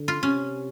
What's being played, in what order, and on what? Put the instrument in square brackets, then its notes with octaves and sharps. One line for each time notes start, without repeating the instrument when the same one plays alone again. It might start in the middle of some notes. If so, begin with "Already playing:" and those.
Already playing: [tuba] D3
[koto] F4
[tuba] C3 [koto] C#4